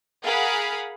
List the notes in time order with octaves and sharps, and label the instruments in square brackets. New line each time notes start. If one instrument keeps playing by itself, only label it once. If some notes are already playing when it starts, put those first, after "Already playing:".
[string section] G#4 A#4 F5 F#5 B5